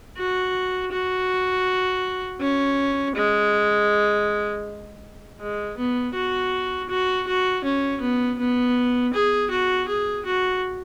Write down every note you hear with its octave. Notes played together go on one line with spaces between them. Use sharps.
F#4
F#4
C#4
G#3
G#3
B3
F#4
F#4
F#4
C#4
B3
B3
G#4
F#4
G#4
F#4